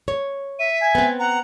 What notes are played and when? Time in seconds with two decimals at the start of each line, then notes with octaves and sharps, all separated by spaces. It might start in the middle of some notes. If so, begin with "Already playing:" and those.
0.08 C#5
0.59 E5 D#7
0.81 G#5
0.95 B3 C4
1.19 F#5 A#5